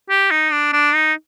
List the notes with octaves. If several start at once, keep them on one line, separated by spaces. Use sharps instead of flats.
G4
D#4
D4
D4
D#4